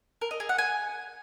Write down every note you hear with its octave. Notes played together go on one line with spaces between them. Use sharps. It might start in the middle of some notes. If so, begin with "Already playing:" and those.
A#4
D#5
G#4
F#5
G#5